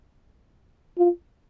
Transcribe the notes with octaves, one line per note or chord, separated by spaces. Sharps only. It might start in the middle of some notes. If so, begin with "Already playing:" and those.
F4